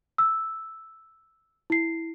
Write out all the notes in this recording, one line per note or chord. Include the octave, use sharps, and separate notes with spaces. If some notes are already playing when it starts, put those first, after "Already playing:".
E6
E4 C7